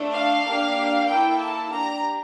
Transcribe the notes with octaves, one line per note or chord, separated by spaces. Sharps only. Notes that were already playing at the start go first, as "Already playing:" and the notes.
Already playing: A3 D4 A4
F5
A#3 D4 G4
A#3 E4 A4 G5
A5
D4 G4 A#5